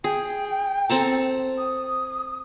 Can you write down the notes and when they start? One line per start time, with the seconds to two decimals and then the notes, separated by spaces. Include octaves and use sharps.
0.04 G#4 G5
0.89 C4 A4 A#5
1.58 D#6